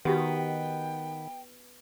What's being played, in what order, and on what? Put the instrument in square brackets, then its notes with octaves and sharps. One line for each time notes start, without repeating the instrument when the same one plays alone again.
[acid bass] D#3 [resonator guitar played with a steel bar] B3 [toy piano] F#4 G4 [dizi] G5